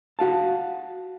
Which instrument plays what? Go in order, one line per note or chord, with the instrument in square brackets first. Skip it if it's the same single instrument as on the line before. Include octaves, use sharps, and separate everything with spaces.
[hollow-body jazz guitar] F#4 F5 A5